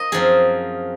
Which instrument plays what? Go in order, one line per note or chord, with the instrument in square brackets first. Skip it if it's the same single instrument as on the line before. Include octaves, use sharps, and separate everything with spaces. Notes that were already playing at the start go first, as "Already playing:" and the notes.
Already playing: [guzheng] A#3 D#5
F#2 F3 C4 G#4